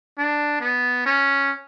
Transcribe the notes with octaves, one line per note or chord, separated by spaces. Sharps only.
D4
B3
C#4